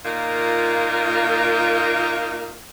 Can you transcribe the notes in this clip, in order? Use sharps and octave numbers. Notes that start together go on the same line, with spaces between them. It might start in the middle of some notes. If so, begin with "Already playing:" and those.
A#2 A#3 D#4 F4 A#4